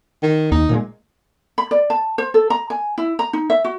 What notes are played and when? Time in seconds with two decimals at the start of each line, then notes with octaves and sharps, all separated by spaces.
0.23 D#3
0.52 D#2 D#4
0.69 A#2 F#3 G#3
1.58 B5
1.71 D5
1.90 A5
2.18 C5
2.34 A4
2.50 A#5
2.70 G#5
2.98 E4
3.19 A#5
3.33 D#4
3.50 E5
3.64 F#4